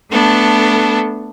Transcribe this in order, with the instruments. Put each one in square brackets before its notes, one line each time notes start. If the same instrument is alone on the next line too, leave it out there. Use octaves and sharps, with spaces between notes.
[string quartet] A3 B3 D4 A4